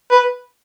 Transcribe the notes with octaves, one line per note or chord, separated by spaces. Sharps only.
B4